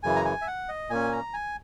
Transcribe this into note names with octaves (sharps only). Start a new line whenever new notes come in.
F#2 C#3 E3 G#5
A#5
G#5
E5
F#5
D#5
A#2 A#3 C#4 G#5
A#5
G#5